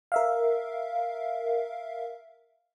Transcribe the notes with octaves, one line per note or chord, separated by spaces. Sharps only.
A#4 E5 F5